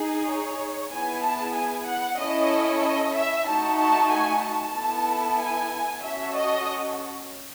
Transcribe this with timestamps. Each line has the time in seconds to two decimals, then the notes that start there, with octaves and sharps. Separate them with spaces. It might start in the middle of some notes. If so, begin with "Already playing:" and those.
Already playing: D#4 G#4
0.27 C#5
0.91 B3 E4 G#4 G#5
1.24 A5
1.56 G#5
1.87 F#5
2.19 C#4 E4 A4 D#5
2.83 D#5
3.15 E5
3.48 A3 D#4 F#4 A5
3.79 A5
4.11 G#5
4.44 A5
4.76 B3 E4 A4
5.40 G#5
6.03 C#4 F#4 A4 E5
6.36 D#5